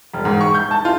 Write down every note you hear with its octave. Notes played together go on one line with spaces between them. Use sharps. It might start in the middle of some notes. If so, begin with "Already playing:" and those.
E1
G#2
C#6
G6
A5
F4